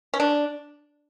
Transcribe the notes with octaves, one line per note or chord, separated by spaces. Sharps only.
C#4
D4